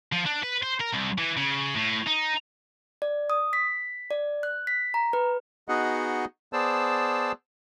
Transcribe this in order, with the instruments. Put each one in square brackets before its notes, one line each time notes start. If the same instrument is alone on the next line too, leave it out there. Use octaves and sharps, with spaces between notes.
[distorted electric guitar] F3
D4
B4
C5
A#4
C2
E3
C#3
A2
D#4
[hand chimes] D5
D#6
B6
D5
F#6
B6
A#5
B4
[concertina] B3 D#4 F#4 G#4 D#5 F#5
B3 G#4 C5 D5 A5 E6